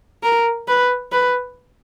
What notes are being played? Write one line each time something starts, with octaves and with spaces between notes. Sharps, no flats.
A#4
B4
B4